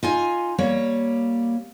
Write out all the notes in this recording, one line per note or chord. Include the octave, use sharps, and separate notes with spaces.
D#4 F4 G#5
G3 A#3 C#5